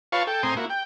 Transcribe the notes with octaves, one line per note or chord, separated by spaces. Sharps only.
F4 B4 C#5 F5 A5 C#6
A4 G5
A2 C4 G#5 A#5 C6 D#6
A#3 E4 F#4
G5